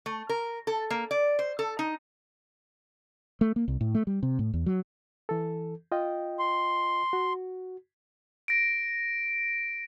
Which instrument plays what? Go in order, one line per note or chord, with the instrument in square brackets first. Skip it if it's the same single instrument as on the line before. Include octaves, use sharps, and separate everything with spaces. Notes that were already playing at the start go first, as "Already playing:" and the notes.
[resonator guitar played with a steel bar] A3
A#4
A4
A#3
D5
C5
A4
D#4
[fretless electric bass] A3
A#3
C2
A2
A3
G3
C3
A2
E2
F#3
[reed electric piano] E3 A4
F4 D#5 G5
[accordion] C6
[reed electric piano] F#4
[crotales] A#6 D7